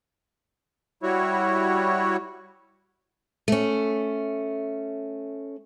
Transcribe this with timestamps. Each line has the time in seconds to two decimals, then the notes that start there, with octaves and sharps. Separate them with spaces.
1.03 G3 E4 F#4 C#5
3.48 A3 C#4